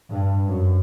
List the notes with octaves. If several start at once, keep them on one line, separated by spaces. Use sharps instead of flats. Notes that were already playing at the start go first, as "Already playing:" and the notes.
G2
F#2